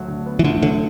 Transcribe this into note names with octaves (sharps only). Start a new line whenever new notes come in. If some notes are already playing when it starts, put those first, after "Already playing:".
Already playing: D2 F#3
D3
B3
E3
D2 D3
D3 F#3